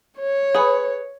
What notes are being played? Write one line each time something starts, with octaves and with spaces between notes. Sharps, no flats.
C#5
G#4 B4